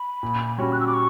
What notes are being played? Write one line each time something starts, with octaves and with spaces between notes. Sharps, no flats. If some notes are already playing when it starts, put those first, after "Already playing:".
Already playing: B5
A#2
G3 C#4 F#4
F#6
E6
D6
C#6